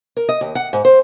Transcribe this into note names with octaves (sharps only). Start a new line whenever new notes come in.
A#4
D#5
D#2
F#5
G#2
C5